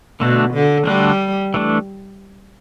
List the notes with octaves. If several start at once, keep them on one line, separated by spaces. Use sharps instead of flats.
B2 D3 A3 D4 F#4
D3
D3 G3 A3 D4 F#4
E3 A3 D4